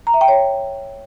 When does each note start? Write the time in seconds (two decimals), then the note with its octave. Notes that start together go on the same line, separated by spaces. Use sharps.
0.07 A#5
0.14 E5
0.21 G5
0.28 C#5